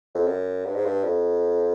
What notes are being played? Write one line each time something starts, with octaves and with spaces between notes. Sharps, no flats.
F2
F#2
G2
G#2
G2
F2